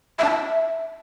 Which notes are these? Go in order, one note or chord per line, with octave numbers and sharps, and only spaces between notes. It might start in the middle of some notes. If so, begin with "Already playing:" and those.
E5
A5
E5